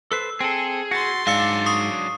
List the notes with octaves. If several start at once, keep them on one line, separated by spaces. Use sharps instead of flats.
A4 B4 C5 E6
C4 G#4 A4
F#4 C6 A6
G#2 F#3 D4 D5 F5 E6 C#7
C#6 D#6 C7